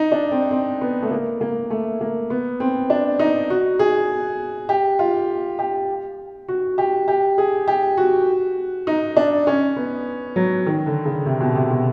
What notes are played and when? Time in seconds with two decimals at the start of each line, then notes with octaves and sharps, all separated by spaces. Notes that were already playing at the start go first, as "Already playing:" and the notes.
Already playing: D#4
0.12 D4
0.31 C4
0.51 C4
0.81 B3
1.02 A3
1.11 A#3
1.41 A#3
1.70 A3
2.01 A#3
2.30 B3
2.60 C4
2.90 D4
3.19 D#4
3.50 F#4
3.79 G#4
4.69 G4
4.99 F4
5.59 G4
6.48 F#4
6.78 G4
7.08 G4
7.38 G#4
7.68 G4
7.97 F#4
8.87 D#4
9.17 D4
9.47 C#4
9.76 B3
10.36 F#3
10.66 D#3
10.86 D3
11.05 C#3
11.26 C3
11.41 B2
11.55 C3
11.71 B2